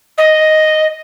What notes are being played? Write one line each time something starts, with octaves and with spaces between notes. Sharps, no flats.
D#5